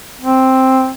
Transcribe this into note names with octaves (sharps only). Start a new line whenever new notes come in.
C4